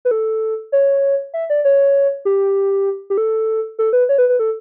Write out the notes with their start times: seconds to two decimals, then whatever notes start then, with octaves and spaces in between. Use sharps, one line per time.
0.05 B4
0.11 A4
0.72 C#5
1.34 E5
1.50 D5
1.65 C#5
2.25 G4
3.10 G4
3.18 A4
3.79 A4
3.93 B4
4.09 C#5
4.18 B4
4.29 B4
4.39 A4